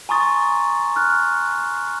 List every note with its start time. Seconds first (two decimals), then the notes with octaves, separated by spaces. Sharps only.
0.09 G#5 A#5 C6 C#6 D#6 A6
0.96 F6 F#6